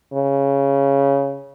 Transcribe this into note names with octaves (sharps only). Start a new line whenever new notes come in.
C#3